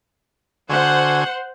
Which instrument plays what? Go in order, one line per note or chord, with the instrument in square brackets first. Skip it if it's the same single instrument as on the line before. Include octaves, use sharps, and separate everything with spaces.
[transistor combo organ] D3 F#4 G#5 [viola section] C5 F#5